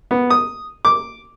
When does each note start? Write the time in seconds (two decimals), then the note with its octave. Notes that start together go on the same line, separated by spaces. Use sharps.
0.11 B3
0.30 D#6
0.85 D6